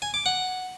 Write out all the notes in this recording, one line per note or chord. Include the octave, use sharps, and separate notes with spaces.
G#5
D6
F#5